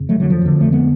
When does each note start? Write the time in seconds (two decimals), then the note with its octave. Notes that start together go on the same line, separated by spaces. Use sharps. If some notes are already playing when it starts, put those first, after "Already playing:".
Already playing: F2 C#3
0.09 F#3 A3
0.20 D3 F#3
0.30 F3
0.42 F2 D3
0.61 A3
0.72 G#3 B3